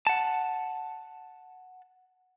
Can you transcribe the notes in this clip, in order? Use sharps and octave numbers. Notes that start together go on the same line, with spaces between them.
F#5 A5